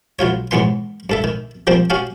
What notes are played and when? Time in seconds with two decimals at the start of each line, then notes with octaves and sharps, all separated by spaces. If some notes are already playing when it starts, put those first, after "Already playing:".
0.19 B1 F#3 F4 C#5
0.51 D#2 G#2 E3 B3 C6
1.10 G2 A4 E5
1.24 D#3
1.67 F3 G3 A#3 C4
1.90 C#4 F#4 G4 F5